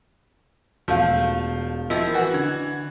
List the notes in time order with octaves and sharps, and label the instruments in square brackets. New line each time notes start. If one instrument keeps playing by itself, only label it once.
[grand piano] E1 F5 [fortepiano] F3 A3
[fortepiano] D#3 F3 E4 [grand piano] D#5
[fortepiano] E3 F#4
[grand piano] D3 G#6